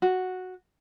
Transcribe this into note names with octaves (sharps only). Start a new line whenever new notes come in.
F#4